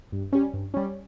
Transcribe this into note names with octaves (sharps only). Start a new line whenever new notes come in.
G2
G3 C#4
G2
G3 C#4